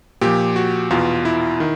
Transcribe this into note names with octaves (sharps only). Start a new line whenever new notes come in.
A#2 F3 G4
F#4
E2 B2 F4
E4
D#3